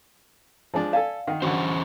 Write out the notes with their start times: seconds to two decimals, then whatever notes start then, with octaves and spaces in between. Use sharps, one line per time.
0.74 F3 G#3 D4
0.93 A4 D5 F5 G#5 A5
1.27 D#3 F#5 G5
1.42 D3 E3 F#3 C#4 C5